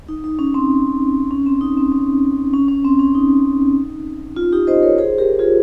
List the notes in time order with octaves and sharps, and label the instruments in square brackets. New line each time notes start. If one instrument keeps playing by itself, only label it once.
[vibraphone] D#4
D#4
C#4
C4
C#4
C4
D#4
C4
C#4
C#4
C#4
C4
C#4
D#4
F4
D#4 G4
C5 D#5
A#4 C#5
G#4 C5
G4 A#4
F4 G#4